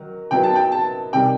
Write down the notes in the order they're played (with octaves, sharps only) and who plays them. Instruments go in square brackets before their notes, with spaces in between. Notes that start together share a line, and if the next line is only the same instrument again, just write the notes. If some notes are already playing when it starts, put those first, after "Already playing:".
Already playing: [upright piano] D#3 F#3
[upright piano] D#3 F#3 B3 E4 [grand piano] G5
[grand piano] A5
G5
A5
[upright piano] C3 D#3 G3 [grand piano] G5